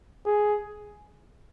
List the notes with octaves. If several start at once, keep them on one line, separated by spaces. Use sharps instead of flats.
G#4